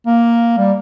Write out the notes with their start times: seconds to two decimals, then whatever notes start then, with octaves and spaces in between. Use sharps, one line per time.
0.07 A#3
0.58 G3